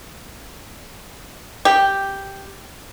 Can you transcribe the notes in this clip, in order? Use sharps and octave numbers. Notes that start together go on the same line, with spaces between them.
G4